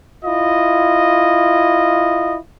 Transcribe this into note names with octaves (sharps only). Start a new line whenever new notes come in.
E4 F4 D#5